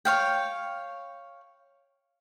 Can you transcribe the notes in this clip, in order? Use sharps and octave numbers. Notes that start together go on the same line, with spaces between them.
C#5 F5 G5